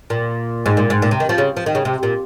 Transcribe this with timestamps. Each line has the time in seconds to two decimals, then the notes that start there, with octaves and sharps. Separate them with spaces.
0.10 A#2
0.66 G#2
0.77 A#2
0.90 G#2
1.02 A#2
1.11 C3
1.20 D#3
1.29 F3
1.38 C#3
1.57 F3
1.66 D#3
1.75 C#3
1.85 C3
2.03 A#2